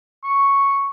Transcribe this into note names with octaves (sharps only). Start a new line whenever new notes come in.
C#6